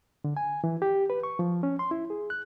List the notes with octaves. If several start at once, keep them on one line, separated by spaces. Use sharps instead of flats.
D3
G#5
E3
G4
B4
C#6
F3
C#4
C6
E4
G#4
F#6